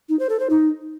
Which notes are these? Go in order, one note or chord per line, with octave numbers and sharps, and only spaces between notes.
D#4
C5
A4
C5
D#4